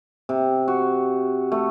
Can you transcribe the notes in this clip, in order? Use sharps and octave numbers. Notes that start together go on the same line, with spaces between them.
C3
F#4
A3